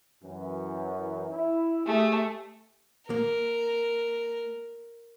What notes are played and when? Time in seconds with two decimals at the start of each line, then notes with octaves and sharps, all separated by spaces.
0.24 F#2 E3
1.32 E4
1.86 A3 G4 G#4
3.10 A#3 A#4